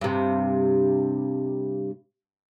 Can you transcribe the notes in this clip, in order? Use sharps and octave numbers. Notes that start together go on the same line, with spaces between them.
G2 C3